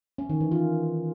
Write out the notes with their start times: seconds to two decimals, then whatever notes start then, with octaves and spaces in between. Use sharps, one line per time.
0.18 C#4
0.29 D#3
0.41 E3
0.52 F4